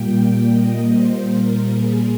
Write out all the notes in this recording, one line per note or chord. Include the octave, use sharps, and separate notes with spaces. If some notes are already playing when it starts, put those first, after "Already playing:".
Already playing: A#2 G3 A#3 G5
D#5
C5
A#4
G#4